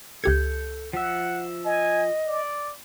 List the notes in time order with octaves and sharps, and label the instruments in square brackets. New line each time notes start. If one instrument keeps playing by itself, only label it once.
[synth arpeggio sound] C#2 G4 G#6 [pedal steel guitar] A4 G6
[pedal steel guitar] F3 E5 [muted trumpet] F#5
[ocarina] D#5 [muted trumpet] G#5
[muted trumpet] D5